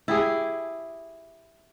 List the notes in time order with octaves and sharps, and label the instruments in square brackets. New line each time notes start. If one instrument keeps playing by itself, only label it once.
[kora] E4 G4 G#4